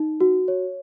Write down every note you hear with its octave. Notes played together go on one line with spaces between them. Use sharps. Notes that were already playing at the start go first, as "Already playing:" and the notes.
Already playing: D#4
F#4
C#5